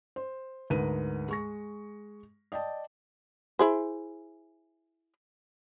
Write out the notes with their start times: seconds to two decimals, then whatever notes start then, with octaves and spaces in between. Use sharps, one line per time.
0.16 C5
0.70 D2 G#2 A#4 B4 D#7
1.29 G#3 C#6 A#6
2.52 D5 D#5 G5 A5
3.59 E4 G#4 C5